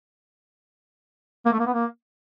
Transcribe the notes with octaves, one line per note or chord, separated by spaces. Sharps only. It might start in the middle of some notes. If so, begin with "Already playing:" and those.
A#3
A3
A#3
B3
A#3